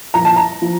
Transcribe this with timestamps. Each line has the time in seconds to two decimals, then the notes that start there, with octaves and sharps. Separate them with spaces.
0.14 A#2 F3 A#5
0.25 A5
0.36 A#5
0.62 F3